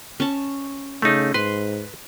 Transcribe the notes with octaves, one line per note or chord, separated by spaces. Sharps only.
C#4 A5
C#3 A3 D#4
G#2 B4 C6